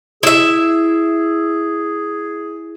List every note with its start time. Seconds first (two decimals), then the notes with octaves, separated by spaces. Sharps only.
0.23 E4 G#4 E5